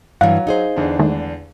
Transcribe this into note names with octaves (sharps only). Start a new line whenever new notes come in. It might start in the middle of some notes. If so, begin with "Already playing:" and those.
G2 E3 F#3 F5 F#5
D#4 G#4 C5
E2 D3 D4
D#3 G#3 A3